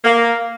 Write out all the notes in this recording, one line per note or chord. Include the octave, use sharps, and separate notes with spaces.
A#3